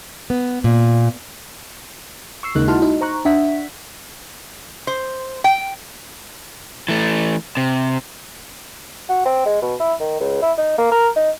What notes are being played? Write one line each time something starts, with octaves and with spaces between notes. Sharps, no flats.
B3
A#2
C#6 E6 C7
D#2 C#3 G#3 A#3 D#4 F#6
D#4 E4 F#4 A5 C6 F6
D#4
C5 A#5 C#6 F#6
D4 E5 F#5 B6
C5
G5
E3 A3
C3
F#4
C4
G#3
B2
E4
D#3
C#2
E4
D#4
A#3
A#4
D#4